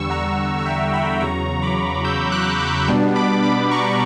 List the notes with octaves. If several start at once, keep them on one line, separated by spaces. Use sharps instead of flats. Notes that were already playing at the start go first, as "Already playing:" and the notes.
Already playing: E2 D3 G3 C#6 E6
F#5 A#5
A#5
E5 G5
G5 B5
E2 C#3 F#3 A#5 C#6
B5 D6
E6 G6
D6 F#6
B5 D6
B2 G3 B3 D4
B5 D6
B5 D6
A#5 C#6